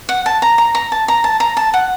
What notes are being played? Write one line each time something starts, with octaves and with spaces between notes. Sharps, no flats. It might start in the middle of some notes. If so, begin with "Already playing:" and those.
F#5
A5
A#5
A#5
A#5
A5
A#5
A5
A#5
A5
F#5